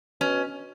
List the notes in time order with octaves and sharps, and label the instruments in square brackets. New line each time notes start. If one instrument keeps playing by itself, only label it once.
[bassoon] B2 [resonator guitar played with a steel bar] C#4